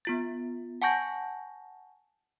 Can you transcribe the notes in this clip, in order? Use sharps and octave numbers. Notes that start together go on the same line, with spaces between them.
B3 F4 A6
F#5 G#5 A5 C#6 G6 A#6